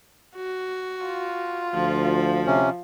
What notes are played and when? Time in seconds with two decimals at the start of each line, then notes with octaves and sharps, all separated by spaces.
0.36 F#4
1.06 F4
1.74 D2 F3
2.47 C3 C#4